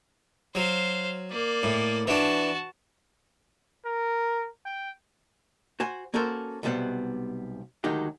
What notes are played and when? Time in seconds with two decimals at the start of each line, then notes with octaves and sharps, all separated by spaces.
0.55 F#3 C5 F5
1.32 A#3 D5
1.63 A2
2.07 E3 D4 F#4 A5
3.85 A#4
4.66 G5
5.80 F#4 C5 G#5
6.14 A#3 C#4 F#4 A4 A#4 C5
6.63 B1 C3 G3 B3 C5 F#5
7.84 D2 D#3 F#3 G#3 D#4 G4